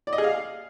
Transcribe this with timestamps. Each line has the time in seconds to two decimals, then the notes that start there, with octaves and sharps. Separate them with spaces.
0.07 D5
0.13 D#5
0.18 G#4
0.24 F5